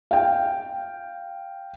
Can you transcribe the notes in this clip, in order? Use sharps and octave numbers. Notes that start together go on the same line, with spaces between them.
F5 G5